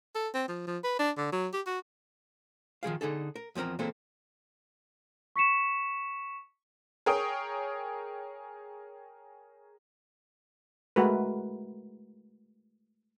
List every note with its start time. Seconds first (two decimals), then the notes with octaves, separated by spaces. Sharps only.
0.15 A4
0.34 C4
0.48 F3
0.67 F3
0.84 B4
0.99 D4
1.17 D3
1.32 F#3
1.53 G4
1.66 F#4
2.83 D#3 F3 G#4 F5
3.01 D3 D#4 G#4 A4
3.36 A#4
3.55 E2 F3 C4 A#4 A#5
3.79 A#2 E3 G#3 A#3 C4 A4
5.36 C#6 B6 C#7 E7
7.06 G#4 A#4 C#5 G5 D#6
10.96 G#3 A3 F#4 A#4 B4